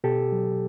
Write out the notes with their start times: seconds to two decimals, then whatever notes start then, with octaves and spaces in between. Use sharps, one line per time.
0.04 B2 G4 A4
0.32 F#3